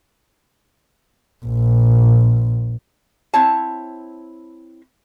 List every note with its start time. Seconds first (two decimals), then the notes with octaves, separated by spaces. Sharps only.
1.45 A#1
3.34 C4 E4 C#5 A5